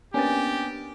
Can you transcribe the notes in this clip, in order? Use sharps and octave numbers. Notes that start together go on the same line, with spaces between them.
A#3 B3 C#4 D4 G4 G#5 A6